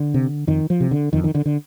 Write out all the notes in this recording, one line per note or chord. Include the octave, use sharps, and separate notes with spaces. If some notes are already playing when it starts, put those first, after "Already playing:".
Already playing: D3
C3
F2 D#3
F3
C3
D3
F2 D#3
D#3
D3
D3